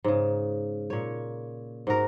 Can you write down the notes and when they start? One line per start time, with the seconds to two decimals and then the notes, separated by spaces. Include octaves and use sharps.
0.04 G#2 C#3
0.90 A#2 C#5
1.87 G#2 F#4 A#4